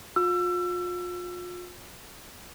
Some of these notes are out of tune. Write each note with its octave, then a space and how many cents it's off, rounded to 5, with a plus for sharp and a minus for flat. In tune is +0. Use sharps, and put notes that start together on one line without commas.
F4 +35 E6 +30